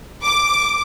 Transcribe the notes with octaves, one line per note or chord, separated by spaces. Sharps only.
D6